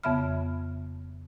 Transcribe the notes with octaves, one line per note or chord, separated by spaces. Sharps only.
F2 C#3 B3 E5 B5 F6